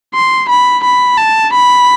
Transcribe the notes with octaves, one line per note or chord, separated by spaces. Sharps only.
C6
B5
B5
A5
B5